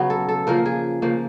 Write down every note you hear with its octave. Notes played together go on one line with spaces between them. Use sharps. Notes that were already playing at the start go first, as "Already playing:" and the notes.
Already playing: C#3 F#3 B3 F#4
A4
A4
C#3 F3 A#3 A#4
G#4
C#3 F3 A#3